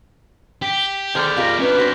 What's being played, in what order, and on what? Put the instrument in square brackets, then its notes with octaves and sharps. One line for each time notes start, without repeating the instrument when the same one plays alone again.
[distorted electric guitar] G4 [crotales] B6 D7
[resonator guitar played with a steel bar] D#3 A4 C5 [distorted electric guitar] G#4 D5 [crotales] D6 F6 G6
[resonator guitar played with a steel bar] F4 G4 A#4 [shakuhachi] D#5
[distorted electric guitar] C#4 D4 [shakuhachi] B4
[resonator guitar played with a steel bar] F#4 C5 [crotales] A#6 B6